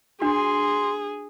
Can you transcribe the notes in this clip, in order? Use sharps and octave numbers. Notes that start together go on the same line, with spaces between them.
D4 F#4 G#4 C6